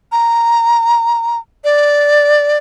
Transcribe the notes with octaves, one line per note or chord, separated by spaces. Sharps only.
A#5
D5